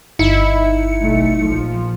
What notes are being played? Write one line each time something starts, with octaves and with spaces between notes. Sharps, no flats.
G1 D#4 E4 C#7
B1 A3
A#1 F3